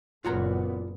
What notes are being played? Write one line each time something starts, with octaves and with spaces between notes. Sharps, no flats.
F#1 A#2 B3 F4 F#4 A#5